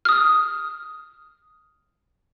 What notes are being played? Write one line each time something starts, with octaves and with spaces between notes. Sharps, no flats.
D#6 F6